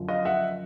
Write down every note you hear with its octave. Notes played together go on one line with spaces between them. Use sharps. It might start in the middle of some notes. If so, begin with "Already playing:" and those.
Already playing: F#2 D3 F3
D#5 F5
E5 F#5